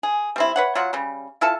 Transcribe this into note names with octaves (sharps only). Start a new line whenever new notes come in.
G#4
G3 C4 E4
B4 C#5 F#5
F#3 F4 C#5 F#5
C#3 G3
E4 F4 A4 A5